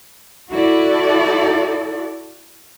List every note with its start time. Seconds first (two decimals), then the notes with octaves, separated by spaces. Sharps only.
0.50 E4 F#4 A4 D5